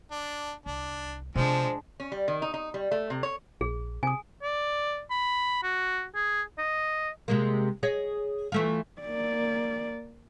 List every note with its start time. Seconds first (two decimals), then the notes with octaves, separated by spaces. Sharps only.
0.12 D4
0.66 C2 D4
1.36 C3 F3 G#3 B3 D4 C5
2.00 C#4
2.12 G3
2.28 D#3
2.42 D#4
2.54 D#4
2.74 G3
2.91 A3
3.10 C3
3.23 C#5
3.61 A#1 G#4
4.03 C3 G#5 D#6
4.43 D5
5.10 B5
5.63 F#4
6.15 G#4
6.58 D#5
7.28 C3 G#3 A#3
7.83 G#4 C#5 D#5
8.52 E3 A3 F4
9.01 A#3 D5